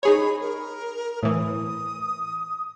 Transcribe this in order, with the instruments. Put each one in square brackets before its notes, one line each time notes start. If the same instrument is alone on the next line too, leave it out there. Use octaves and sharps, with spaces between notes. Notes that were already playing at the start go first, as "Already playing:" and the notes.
[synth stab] D#4 G#4 C#5 [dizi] B5
[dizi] A#4
[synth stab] A2 E3 [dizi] D#6